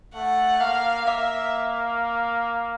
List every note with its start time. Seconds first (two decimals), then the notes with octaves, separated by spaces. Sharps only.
0.15 A3 F#5
0.61 A#3 F5
1.07 A#3 E5